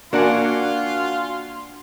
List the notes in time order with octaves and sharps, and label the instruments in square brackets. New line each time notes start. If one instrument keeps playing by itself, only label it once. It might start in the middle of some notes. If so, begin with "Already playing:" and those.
[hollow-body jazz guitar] A#3 D4 [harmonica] F4 C6 [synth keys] F#4 F#5 G#5